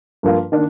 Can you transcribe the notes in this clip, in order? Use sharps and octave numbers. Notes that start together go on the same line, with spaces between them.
G2 F3 A#3 F4
D#3 A#3 D4